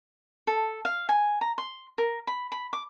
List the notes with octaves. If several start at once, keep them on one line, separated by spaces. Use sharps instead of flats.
A4
F5
G#5
A#5
C6
A#4
B5
B5
D6